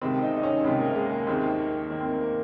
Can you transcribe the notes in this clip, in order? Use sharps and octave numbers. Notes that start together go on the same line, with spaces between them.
C#2 C3 D#3 C4
D#4
D#4
C#4
C#2 C3 D#3 C4
A#3
G#3
A#3
D#2 D#3 C4
A#3
D#2 D#3 A#3
C4
A#3
A#3